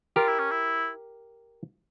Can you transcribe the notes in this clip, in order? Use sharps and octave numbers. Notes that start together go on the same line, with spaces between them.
F4 G4 A#4
E4
C#4
E4